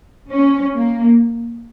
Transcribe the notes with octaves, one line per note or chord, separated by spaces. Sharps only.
C#4
A#3